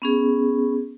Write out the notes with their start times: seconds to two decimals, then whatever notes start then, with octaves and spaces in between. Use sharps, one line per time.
0.02 B3 C#4 G#4